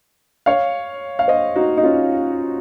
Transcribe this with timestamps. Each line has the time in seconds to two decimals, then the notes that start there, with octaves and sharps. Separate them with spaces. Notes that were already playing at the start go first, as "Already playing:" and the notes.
0.46 C#5 F5
1.19 F5
1.28 C5 D#5
1.56 D#4 F#4
1.78 D#4
1.84 C#4 F4